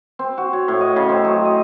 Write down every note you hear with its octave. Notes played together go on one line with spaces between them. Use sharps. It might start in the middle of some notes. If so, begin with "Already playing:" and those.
C4
F#4
C#5
A2
D#5
C#3
C4
F#3
D#5